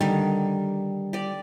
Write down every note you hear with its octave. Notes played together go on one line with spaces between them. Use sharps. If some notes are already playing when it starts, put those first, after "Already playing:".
D3 D#3 G3
G4 D5